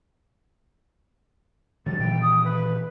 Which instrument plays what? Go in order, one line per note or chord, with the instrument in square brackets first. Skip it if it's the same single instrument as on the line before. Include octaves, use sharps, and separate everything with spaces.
[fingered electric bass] D3 F#3 G3 [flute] A6
[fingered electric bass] A#2 D#3 E3 [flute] G5
[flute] D#6
B4